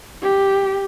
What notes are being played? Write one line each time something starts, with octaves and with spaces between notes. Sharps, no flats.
G4